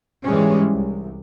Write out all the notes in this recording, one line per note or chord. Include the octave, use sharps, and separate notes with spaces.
G#2 E3 G3 G#3 C#4
C2